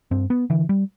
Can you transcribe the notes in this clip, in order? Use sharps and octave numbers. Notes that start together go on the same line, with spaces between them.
G2 C4
B3
D3 E3
G3